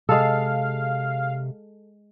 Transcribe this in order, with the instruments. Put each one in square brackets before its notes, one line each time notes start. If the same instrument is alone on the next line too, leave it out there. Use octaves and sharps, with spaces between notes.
[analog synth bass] C3 [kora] G#3 A4 [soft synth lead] F5